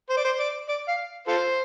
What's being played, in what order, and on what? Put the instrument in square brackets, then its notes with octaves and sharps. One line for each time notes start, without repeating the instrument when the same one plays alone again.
[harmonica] C5
D5
C5
D5
D5
F5
F4 A4 C5